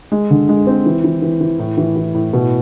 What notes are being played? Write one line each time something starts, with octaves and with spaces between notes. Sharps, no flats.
G#3
D3
G#3
C4
E3
E3
E3
E3
A2
E3
E3
A2
B2